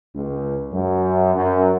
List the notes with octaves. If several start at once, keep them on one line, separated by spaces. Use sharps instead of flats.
C#2
F#2
F#2